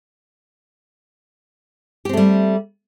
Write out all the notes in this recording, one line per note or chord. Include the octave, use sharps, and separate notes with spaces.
G3 A3 C4 G4